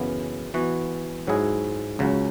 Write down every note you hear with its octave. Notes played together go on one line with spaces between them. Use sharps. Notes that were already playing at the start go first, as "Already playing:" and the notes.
Already playing: F#2 C#3 E3 B3
E3 B3 F#4
G#2 F#3 E4 G#4
C#2 C#3 F#3